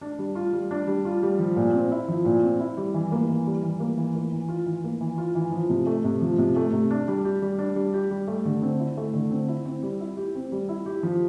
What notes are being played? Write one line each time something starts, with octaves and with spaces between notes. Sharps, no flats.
D4
G3
F4
G3
D4
G3
F4
G3
F3
A#2
C4
E4
F3
A#2
C4
E4
G3
E3
A#3
E3
G3
E3
A#3
E3
A#3
E3
F4
E3
A#3
E3
F4
E3
F3
C3
A3
C3
F3
C3
A3
C3
D4
G3
G4
G3
D4
G3
G4
G3
A3
D3
C4
E4
A3
D3
C4
E4
C4
G3
E4
G4
C4
G3
E4
G4
F3